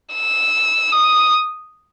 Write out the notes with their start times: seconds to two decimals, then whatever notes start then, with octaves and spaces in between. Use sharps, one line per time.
0.14 E6
0.92 D#6